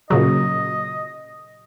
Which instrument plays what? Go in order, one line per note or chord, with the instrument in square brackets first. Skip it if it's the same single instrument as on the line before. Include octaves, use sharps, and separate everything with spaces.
[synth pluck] A#2 C#3 F#3 [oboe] D#5